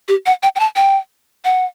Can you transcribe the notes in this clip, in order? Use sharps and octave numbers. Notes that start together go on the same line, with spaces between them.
G4
F#5
G5
G5
A5
G5
F#5